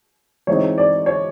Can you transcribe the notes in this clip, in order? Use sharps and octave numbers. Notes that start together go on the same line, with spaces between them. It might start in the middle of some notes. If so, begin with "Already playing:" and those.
E3 G#3 C4 D#4 C#5
D5
C#5